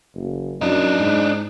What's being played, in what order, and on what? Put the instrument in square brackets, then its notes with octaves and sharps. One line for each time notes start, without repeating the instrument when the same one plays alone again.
[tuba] F#1
[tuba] F#2 [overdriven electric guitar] D4 D#4
[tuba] G#2